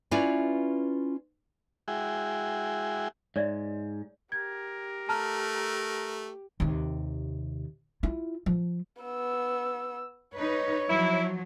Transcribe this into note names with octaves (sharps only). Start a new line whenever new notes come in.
C#4 E4 F4 B4 D5
G#3 E4 F#4 G#4 G5
G#2 C#5 D5 E5
G4 A#4 G#6
A3 A5 A#5 F6
D#2 C3
E4 F4
F3
B3 E6
D#4 B4 C#5
F3 F#3 E4